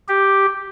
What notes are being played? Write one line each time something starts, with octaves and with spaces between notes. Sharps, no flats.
G4